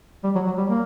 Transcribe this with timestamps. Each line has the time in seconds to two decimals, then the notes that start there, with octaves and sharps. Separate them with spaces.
0.24 G3
0.35 F#3
0.47 F#3
0.58 G3
0.69 A#3